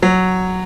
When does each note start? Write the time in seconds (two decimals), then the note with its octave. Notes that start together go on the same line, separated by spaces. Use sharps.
0.03 F#3